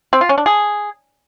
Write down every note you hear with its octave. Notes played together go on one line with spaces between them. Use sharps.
C4
F4
C#4
D4
G#4